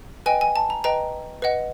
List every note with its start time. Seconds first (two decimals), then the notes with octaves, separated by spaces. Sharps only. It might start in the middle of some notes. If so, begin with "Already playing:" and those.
0.26 B4 D#5 G5 G#5
0.41 G#5
0.56 A5
0.70 A#5
0.84 B4 D#5 G5 A#5
1.42 B4 D#5 F#5